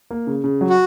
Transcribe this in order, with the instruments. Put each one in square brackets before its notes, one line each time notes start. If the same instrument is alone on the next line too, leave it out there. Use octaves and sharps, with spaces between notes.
[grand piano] A#3
C#3
C#3
F#3
[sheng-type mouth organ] F#4